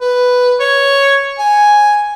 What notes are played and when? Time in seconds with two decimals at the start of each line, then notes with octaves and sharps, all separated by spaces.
0.01 B4
0.60 C#5
1.39 G#5